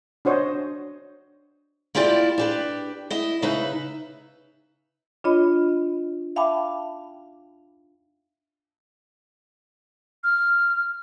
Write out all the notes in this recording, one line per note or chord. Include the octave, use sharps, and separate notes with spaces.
D4 F#4 C5 C#5 D#5
A#3 E4 F4 G4 D5
D4 G4 B4
E4 D#5
C#3 D#4 B4 E5
D4 F4 C#5 D#5 B5
E5 F5 G5 A5 B5 D6
F6